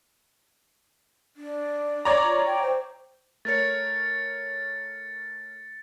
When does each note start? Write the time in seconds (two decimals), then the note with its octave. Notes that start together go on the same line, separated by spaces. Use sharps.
1.37 D4
2.05 C#5 D5 A#5
2.23 F4
2.46 G5
2.62 C5
3.45 A3 A#4 C#5 A6 C#7